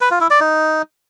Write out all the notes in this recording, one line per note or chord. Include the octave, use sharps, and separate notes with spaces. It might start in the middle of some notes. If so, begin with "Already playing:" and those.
B4
F4
E4
D5
D#4